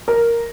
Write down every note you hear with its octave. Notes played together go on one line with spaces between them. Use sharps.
A#4